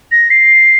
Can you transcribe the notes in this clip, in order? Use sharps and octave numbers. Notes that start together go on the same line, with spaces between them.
A#6
C7